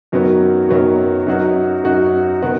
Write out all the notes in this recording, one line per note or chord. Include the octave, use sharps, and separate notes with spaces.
F#2 D#3 F#3 B3 F#4
F#2 D#3 F#3 B3 F#4
F#2 F#3 D#4 F#4
F#2 F#3 D#4 F#4
D#3 B3 F#4